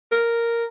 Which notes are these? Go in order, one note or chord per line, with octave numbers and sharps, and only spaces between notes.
A#4